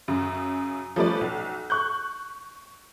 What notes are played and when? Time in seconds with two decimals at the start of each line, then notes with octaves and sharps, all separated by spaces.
0.08 F#2 C#3
0.96 F3 G3 A3 C#4 B4 D5
1.21 B1
1.70 C#6 F#6 G6